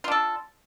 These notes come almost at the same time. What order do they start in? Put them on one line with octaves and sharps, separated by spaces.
F4 D4 A4